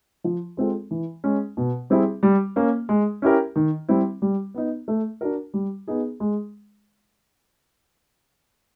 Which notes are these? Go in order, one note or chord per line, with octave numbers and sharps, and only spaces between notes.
F3
G#3 C4 F4 A4
E3
G#3 C#4
B2
G3 C4 E4 G#4
G3
A#3 C#4
G#3
C#4 E4 G4 A#4
D#3
G3 C4 E4
G3
B3 D#4
A3
D4 F#4 A#4
G3
B3 D#4 G#4
G#3